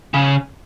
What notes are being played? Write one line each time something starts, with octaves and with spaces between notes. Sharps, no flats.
C#3